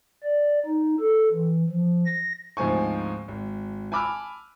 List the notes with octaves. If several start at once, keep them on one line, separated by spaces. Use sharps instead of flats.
D5
D#4
A4
E3
F3
A#6
D2 G#2 F3 C4 G#5 C#6
G#1
G#5 A5 B5 D6 E6 F6